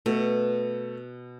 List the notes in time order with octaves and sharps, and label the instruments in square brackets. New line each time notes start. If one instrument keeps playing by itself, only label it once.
[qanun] B2 [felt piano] A3